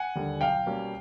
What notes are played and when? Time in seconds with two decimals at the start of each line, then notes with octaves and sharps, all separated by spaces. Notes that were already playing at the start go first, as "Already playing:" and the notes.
Already playing: F#5 G#5
0.15 D#2 D3 G3
0.41 B1 F5 G5
0.66 B2 G3 A#3 C#4